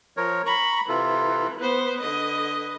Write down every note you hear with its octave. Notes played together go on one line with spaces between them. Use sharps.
F3 A#4 C#5
A#5 B5 C#6
C3 E3 F4 A4
B3 B4 C5
D3 D#5